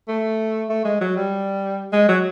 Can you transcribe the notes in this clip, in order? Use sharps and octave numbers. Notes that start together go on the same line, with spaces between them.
A3
A3
G#3
F#3
G3
G#3
F#3